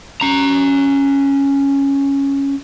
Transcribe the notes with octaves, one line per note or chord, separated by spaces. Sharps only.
C#4 A#5